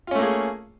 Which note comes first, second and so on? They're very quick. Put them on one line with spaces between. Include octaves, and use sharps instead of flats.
F4 C#4 A3 A#3 G#4